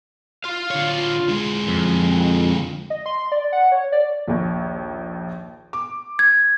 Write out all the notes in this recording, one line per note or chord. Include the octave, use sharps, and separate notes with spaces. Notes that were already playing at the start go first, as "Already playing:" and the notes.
F4 F5
D3 C#5
D3 G#3
F2
D#5
C6
D5
F#5
C#5
D5
A#1 D#2
D6
G#6